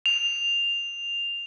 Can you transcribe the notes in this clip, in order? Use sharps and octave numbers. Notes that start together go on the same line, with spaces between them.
F7